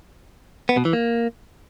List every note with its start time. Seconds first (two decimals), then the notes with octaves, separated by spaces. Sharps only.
0.69 B3
0.77 B2
0.85 E3
0.93 A#3